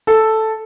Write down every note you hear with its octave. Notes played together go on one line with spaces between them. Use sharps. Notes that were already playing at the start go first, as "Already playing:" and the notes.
A4